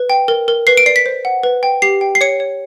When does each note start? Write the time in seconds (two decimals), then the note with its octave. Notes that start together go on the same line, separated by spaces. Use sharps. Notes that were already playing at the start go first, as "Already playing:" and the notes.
Already playing: B4
0.10 G5
0.28 A#4
0.48 A#4
0.67 B4 C7
0.77 D7
0.86 D5 C7
0.96 B6
1.06 C5
1.25 F#5
1.43 B4
1.63 G5
1.82 G4 C7
2.01 G5
2.15 C7
2.21 C#5 C#7
2.40 C#5